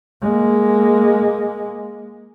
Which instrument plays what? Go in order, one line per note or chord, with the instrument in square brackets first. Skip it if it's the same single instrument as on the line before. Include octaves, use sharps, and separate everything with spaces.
[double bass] G#3 A#3